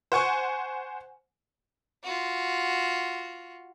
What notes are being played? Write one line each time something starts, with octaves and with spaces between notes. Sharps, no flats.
C5 F#5 G#5 C#6
F4 F#4